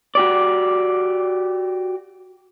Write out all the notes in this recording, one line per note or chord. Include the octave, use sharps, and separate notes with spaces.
F#4 G4 D5